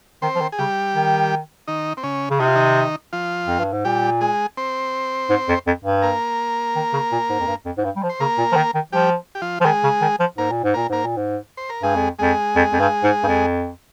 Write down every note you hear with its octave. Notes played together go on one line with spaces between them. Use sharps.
D#3 C4 C5
F3
D#3
G#4
C#3 G3 G4
D#3
D#3 D#4
C4
C#3 C#4
C#3
C3 D#4
F4
D#3 D#4
F3 F4
F2
G2
G#2
A#2 G3 G4
G#3 G#4
C4 C5
G#2
F2
F2
G2
A#3 A#4
D#3
C#3
A#2
G#2
F2
G2
F2
G#2
G2
G3
F3
C5
C#3 A#3 A#4
A#2
F3
D#3
D#3
F3 G3 G4
G4
F3 F4
F3
D#3 G#3 G#4
C#3
D#3
F3
G#2 A#3 A#4
A#2
G#2
A#2 A#3 A#4
G#2 A#3 A#4
A#2
G#2
C5
A#4
G2 G#3 G#4
F2
F2 G#3 G#4
F2
F2
G2
G#2
G2
F2